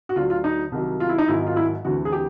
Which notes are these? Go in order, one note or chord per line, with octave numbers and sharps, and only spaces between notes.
F#4
D2 D3 F#3 F4
F4
D#4
C2 C3 D#3 F#3
F4
E4
D#4
G#1 G#2 D#3 F#3 E4
F4
E4
D2 C3 E3 F#4
G#4
G4